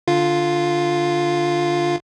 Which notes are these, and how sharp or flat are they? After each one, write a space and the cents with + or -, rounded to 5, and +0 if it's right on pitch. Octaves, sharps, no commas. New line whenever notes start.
D3 +0 F4 +0